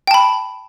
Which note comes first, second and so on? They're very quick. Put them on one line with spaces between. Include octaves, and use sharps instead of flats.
G5 A5 B5